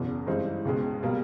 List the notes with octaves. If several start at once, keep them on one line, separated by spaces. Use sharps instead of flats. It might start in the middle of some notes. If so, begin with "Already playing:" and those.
Already playing: F#1 E2 B2
G2 E3 G#3 C4 D#4
C#2 B2 G#3
B2 G3 A#3